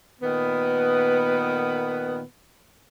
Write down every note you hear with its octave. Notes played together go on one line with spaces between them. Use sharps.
A#2 D#3 B3